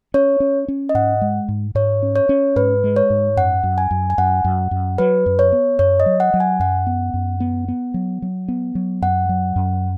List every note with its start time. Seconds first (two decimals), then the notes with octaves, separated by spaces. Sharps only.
0.14 C#4 C#5
0.40 C#4
0.68 C#4
0.89 D#5
0.94 G#2 F#5
1.21 G#3
1.48 G#2
1.75 G#2 C#5
2.02 C#4
2.16 C#5
2.29 C#4
2.56 G#2 B4
2.84 G#3
2.96 C#5
3.10 G#2
3.37 F#2 F#5
3.63 F#2
3.78 G#5
3.91 F#2
4.10 G#5
4.18 F#2 F#5
4.44 F#2
4.71 F#2
4.98 F#3 B4
5.26 F#2
5.39 C#5
5.52 B3
5.79 F#2 C#5
6.00 D#5
6.06 F#3
6.20 F#5
6.34 F#3
6.40 G#5
6.60 F#2 F#5
6.87 B3
7.14 F#2
7.40 B3
7.68 B3
7.94 F#3
8.22 F#3
8.48 B3
8.75 F#3
9.02 F#2 F#5
9.29 F#3
9.56 F#2